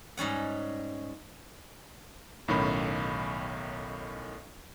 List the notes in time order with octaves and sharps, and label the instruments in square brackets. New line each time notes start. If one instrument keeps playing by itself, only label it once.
[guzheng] G#2 G3 C#4 F#5
[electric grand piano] B1 A2 D#3 C#4 B5